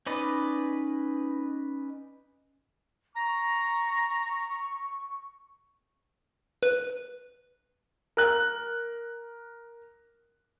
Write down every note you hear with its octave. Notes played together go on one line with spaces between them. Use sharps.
C#4 D#4 B4 D5 D#5
A#5 C#6
B4
A#4 F#6